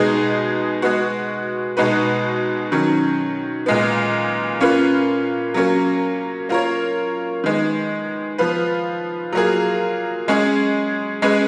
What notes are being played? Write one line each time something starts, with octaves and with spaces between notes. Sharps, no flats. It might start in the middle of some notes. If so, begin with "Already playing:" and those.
Already playing: B2 G#3 B3 D#4 G#4
G#3 B3 F#4
B2 G#3 D#4 F#4 B4
D#3 F#3 C#4
A#2 G#3 B3
A#3 C#4 F4 B4
F#3 A#3 C#4
A#3 F4 A#4 C#5
D#3 G#3 B3
F3 B3 F4 B4
F#3 A#3 F4 G#4
G#3 C#4 G#4
G#3 C#4 G#4 B4